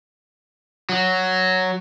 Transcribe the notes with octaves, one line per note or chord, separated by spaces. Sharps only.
F#3